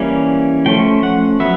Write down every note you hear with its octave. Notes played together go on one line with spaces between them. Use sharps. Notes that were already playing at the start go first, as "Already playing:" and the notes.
Already playing: E3 G3 A#3 C#4
F3 A3 C#4 G5
F#5
F#3 B3 E5